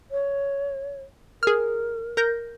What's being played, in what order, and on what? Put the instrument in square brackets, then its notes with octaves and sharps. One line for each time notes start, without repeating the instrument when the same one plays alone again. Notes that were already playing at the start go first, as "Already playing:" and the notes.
[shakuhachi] C#5
[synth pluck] G#4 F6 [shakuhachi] A#4
[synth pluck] A#4 G6 A#6